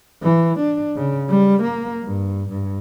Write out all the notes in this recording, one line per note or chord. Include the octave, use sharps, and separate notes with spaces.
E3
D4
C#3
G3
A#3
G2
G2